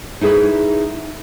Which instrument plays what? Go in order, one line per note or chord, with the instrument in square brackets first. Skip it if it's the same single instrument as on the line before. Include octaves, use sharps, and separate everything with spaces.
[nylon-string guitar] D#4 E4 G#4 A4 B4